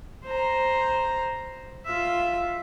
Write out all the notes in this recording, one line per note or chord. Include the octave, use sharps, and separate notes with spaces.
C5 A#5
F4 E5